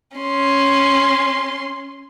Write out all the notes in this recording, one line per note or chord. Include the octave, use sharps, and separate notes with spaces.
C#4 C6